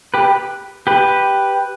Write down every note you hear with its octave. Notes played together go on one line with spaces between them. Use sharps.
G4 B4
G4 B4